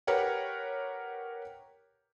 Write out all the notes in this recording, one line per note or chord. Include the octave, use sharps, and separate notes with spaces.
G4 A#4 B4 C#5 F#5 G5